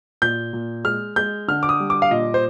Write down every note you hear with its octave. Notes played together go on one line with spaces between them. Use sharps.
A#2 G6
A#2
G#3 F6
G#3 G6
D3 F6
D6
D#6
G3
D6
F5
A#2 D#5
C5